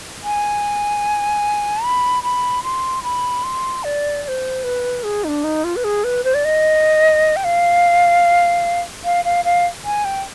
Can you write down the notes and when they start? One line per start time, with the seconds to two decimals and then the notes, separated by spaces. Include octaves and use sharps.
0.24 G#5
1.84 B5
2.23 B5
2.63 C6
3.03 B5
3.44 C6
3.84 D5
4.24 D5
4.28 C5
4.64 B4
5.04 G#4
5.24 D#4
5.28 D4
5.44 D#4
5.64 F4
5.76 B4
5.84 G#4
6.04 B4
6.24 C5
6.34 D5
6.45 D#5
7.36 G5
7.44 F5
9.05 F5
9.25 F5
9.45 F5
9.85 G#5
10.05 G5